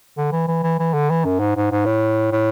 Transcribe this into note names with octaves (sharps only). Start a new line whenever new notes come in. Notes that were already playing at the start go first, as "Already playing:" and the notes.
D3
E3
E3
E3
E3
D3
E3
F#2
G#2
G#2
G#2
A2
A2